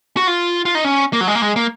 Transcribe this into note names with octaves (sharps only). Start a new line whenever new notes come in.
F#4
F4
F4
D#4
C#4
A#3
F#3
G#3
A#3
G#3
A#3